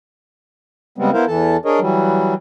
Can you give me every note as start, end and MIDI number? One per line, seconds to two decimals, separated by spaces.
0.98 1.11 49
0.98 1.11 55
0.98 1.11 56
0.98 1.11 59
0.98 1.11 60
1.14 1.25 59
1.14 1.25 64
1.14 1.25 70
1.14 1.25 72
1.14 1.25 77
1.28 1.57 40
1.28 1.57 52
1.28 1.57 69
1.28 1.57 81
1.65 1.80 62
1.65 1.80 68
1.65 1.80 70
1.65 1.80 73
1.65 1.80 75
1.80 2.34 52
1.80 2.34 54
1.80 2.34 55